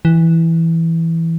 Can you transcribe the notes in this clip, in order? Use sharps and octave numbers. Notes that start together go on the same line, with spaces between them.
E3